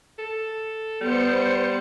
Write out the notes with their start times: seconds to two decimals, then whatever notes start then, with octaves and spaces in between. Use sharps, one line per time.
0.19 A4
1.01 G3 B3 C5 C#7